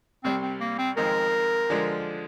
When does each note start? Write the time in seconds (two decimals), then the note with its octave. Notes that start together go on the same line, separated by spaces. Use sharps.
0.24 C2 C3 G3 C4
0.42 C4
0.61 A#3
0.79 C4
0.97 F2 D#3 G#3 C4 A#4
1.70 D3 F3 G#3 D4